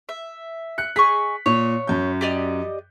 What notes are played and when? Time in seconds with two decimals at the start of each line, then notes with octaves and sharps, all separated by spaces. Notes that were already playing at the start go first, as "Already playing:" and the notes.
0.09 E5
0.78 F#6 C#7
0.96 G#4 D#5 C#6 B6
1.46 A#2 C#5
1.87 F#2 G6
2.21 G4 D5 D#5